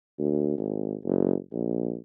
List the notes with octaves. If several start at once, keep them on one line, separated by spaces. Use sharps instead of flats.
D2
G#1
F#1
A#1